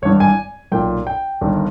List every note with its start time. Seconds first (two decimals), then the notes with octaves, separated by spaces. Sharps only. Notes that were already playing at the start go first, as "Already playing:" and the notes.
0.02 G#1 G2 E3 C#5
0.20 G#5
0.72 B1 A#2 G5
1.07 G5
1.41 G1 G2 D#3